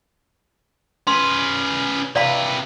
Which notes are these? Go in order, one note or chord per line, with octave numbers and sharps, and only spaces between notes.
C#4 B4 C6
C3 B4 D5 F5 B5